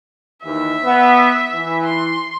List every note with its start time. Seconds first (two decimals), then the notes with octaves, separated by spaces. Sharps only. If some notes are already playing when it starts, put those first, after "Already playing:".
0.43 D#2 E3 E5
0.84 B3
1.53 E3
1.86 C6